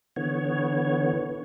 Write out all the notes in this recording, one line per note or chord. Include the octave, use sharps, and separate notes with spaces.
D3 E3 B3 C#5